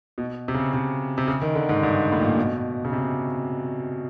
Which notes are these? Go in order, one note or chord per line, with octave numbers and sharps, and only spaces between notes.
B2
C3
C#3
C3
C3
C#3
D#3
D3
G#2
G2
A2
A#2
B2
C#3
C3